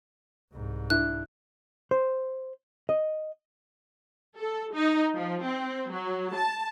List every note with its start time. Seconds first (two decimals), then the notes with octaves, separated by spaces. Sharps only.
0.53 C2 G#2
0.90 D4 E4 F#6
1.91 C5
2.89 D#5
4.38 A4
4.73 D#4
5.16 F3
5.46 C4
5.92 F#3
6.36 A5